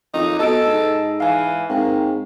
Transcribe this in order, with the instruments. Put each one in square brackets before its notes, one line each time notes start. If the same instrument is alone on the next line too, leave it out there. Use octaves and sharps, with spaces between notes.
[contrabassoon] F2 [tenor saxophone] D#4
[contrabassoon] B2 [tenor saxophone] A4 [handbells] D#5 E6 D7
[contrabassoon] G#2
[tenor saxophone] E3 [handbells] F5 G#5
[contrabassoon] G#2 [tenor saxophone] A#3 [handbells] C4